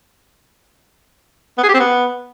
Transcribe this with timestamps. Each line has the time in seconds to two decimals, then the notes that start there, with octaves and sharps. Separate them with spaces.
1.58 B3
1.63 G#4
1.68 G4
1.74 C4
1.79 B3